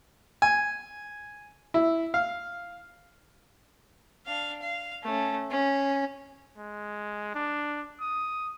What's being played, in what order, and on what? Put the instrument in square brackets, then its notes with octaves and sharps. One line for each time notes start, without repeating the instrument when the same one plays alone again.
[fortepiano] G#5
E4
F5
[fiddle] D4 F5
F5
A3 C#4
C#4
[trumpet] G#3
D4
D#6